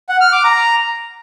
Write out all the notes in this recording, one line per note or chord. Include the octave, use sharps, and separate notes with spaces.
F#5
F6
D6
A#5